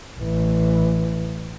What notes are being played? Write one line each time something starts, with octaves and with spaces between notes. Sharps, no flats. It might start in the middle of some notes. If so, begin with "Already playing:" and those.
A1 E3